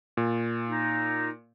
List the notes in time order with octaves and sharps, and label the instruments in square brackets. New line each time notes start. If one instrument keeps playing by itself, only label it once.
[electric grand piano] A#2
[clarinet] D#4